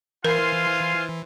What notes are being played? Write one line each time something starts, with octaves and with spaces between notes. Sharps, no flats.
E3 F4 A#4 C5 F5 G#5 C6